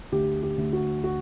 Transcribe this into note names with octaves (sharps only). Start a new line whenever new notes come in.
D2 G4
G4
D2
F#4
F#4